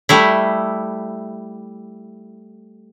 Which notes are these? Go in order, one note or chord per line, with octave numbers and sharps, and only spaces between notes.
G3 A3 E4